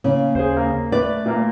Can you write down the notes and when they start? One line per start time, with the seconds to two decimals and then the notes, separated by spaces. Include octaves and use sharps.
0.04 C#3 A#3
0.35 D#2 G#4 C5
0.57 A#3
0.92 A3 B4 D5
1.26 A#2 A#3